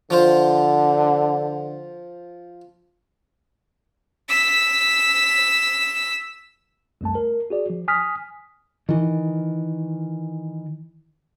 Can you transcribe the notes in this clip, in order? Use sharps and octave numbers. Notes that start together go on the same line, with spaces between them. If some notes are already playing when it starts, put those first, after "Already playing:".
D3 F3 F4 C5
E6 B6
C2 F#2 A3 A5
A#4
F#4 G#4 D5
F3
G#5 D#6 F6 B6
D#3 E3